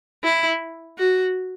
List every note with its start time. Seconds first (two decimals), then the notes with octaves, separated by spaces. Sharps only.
0.24 E4
0.98 F#4